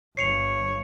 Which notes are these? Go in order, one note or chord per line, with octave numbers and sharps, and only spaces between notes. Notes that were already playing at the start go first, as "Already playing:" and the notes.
G1 C#5 C7 C#7 F7